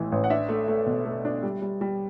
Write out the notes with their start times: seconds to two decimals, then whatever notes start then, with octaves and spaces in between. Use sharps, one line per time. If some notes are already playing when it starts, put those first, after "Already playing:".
Already playing: A1 A2 E3
0.12 A1
0.24 F#5
0.30 D4 E5
0.49 A3
0.68 A3
0.86 B2
1.06 A3
1.25 D4
1.43 G3
1.62 G3
1.81 G3